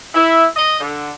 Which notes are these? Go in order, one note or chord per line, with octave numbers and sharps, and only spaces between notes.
E4
D#5
D3